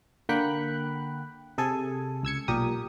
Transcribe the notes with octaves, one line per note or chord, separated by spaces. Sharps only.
D3 A#3 F#5 G5 B5 F#6
C3 G#4 A4 G#5
C#2 E6 G#6 C#7
B1 A#2 G4 A#4 D#6